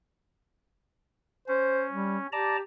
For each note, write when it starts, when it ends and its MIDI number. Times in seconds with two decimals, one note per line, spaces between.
1.48 2.27 61
1.48 1.86 72
1.92 2.17 55
2.32 2.62 67
2.32 2.57 74
2.32 2.57 81
2.32 2.57 82